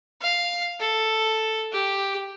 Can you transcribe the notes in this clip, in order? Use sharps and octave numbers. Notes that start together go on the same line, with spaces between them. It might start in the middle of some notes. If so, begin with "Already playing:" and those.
F5
A4
G4